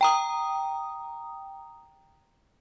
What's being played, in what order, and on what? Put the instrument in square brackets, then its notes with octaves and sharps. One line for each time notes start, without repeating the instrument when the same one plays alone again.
[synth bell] G5 A#5 D#6